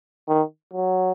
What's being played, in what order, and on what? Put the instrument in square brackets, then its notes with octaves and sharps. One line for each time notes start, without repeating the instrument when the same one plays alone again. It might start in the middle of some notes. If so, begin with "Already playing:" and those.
[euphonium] D#3
F#3